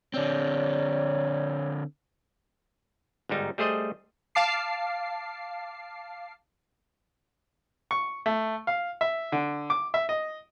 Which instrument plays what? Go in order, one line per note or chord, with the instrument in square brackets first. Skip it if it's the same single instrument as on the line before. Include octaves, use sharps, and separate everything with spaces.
[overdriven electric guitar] D3 C4 [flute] C#5 [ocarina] D5
[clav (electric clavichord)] G1 G#2 G3 D#4
G3 A3 G#4 C5 D#5
[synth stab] F5 A5 D6 C7
[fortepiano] C#6
A3
F5
E5
D3
D6
E5
D#5